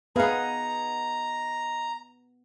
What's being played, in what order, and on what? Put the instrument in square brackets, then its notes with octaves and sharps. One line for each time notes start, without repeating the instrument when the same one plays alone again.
[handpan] B3 [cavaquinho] D#4 G#4 [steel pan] B4 F5 [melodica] A#5